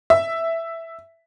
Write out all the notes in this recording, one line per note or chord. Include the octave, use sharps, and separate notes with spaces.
E5